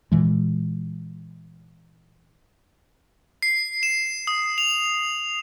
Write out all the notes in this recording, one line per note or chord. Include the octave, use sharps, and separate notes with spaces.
A#2 E3 G#3
C7
E7
D#6
F7